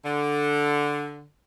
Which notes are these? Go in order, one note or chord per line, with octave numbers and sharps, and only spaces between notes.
D3